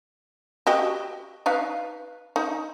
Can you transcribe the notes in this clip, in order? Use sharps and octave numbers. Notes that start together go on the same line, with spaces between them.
F#4 G4 D#5
D#4 B4 F5
D#4